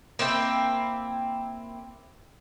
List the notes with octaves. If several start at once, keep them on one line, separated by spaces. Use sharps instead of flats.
A#3 C4 E4 G5